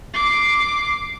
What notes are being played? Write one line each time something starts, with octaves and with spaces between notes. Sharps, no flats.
D6 C7